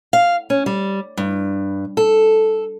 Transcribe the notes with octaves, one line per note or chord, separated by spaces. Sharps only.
F5
C#4
G3
G2
A4